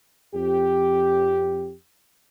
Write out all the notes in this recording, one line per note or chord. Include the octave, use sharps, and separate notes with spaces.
F2 G4